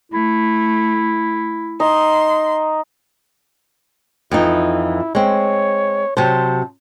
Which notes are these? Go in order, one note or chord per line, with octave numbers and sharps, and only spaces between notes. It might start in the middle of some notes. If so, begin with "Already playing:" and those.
A3 E4
D#4 C6
F2 E3 D#4 E4
G#3 C4 C#5
C3 F#3 C5 A5